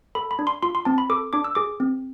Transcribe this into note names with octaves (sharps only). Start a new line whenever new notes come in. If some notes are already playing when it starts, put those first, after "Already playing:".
A4 B5
B5
D4
C6
F4 C6
C6
C4 A5
B5
A4 D6
D4 D6
E6
G#4 D6
C4